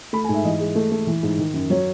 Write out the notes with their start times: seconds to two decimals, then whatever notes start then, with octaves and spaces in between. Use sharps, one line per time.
0.13 A3 B5
0.24 G#5
0.29 G#2
0.34 E5
0.44 E3 D#5
0.60 G#3
0.75 A3
0.92 A3
1.07 E3
1.23 G#2
1.38 D#3
1.54 F#2
1.70 F#3 C#5